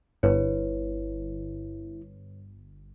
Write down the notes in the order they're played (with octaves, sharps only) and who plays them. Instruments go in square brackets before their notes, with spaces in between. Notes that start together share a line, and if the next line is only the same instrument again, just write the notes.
[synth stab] G1 [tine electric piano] E4 [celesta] B4 C#5